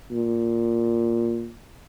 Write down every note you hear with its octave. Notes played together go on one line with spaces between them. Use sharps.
A#2